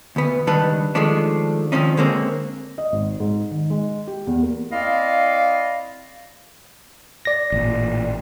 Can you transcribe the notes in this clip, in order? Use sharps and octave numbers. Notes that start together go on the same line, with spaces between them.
D2 B3
C#2 D#3 G3 D4 B4 A5
D#3 F3 G#3 A3 D4
D#3 F3 C4 C#4 D#4
D3 G#3 A#3 C4 C#4
D#5
G#1
G#2
D#3
G#3
G4
E2
A#3
C4 E4 D5 D#5 F5
D5 A#6
A1 A#2